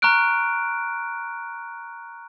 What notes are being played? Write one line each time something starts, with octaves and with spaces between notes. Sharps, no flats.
A#5 C#6 F6 F#6 D7